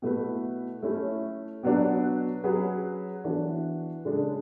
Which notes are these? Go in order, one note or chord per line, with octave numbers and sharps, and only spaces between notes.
B2 A3 E4 B4
A3 C#4 E4
B2 F#3 B3 D4 F#4
F#3 C#4 G#4 B4
E3 B3 D4 F#4
C#3 G#3 D4 A4